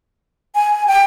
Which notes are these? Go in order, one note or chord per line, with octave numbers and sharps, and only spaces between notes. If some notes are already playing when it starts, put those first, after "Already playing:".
G#5
G5